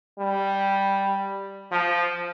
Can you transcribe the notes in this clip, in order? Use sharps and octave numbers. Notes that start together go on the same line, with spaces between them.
G3
F3